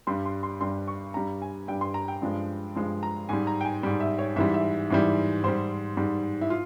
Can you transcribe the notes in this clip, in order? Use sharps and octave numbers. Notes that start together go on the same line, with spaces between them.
G2 G3 C6
C6
C6
G2 G3 C6
C#6
G2 G3 A#5
G#5
G2 G3 G5
C6
A#5
G5
G2 F3 G#3
G2 F3 G#3
A#5
G#2 G3 G#5
A#5
G5
G#5
G#2 G3
E5
C#5
G#2 E3 G3 E5
E5
G#2 E3 G3
G#2 G3 C5
G#2 G3
E4
F4